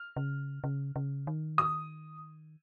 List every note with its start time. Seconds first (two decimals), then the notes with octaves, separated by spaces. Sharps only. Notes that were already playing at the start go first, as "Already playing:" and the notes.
Already playing: F6
0.16 C#3
0.64 C#3
0.96 C#3
1.27 D#3
1.58 D#6